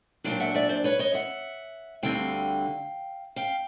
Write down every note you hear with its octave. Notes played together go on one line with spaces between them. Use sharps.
A#2 F#3 A3 D4 F5 G5
E5 F#5
D5 E5
C5 D5
B4 C#5
C#5 D#5
E5 F#5
D2 D3 G3 C4 F5 G5
F5 G5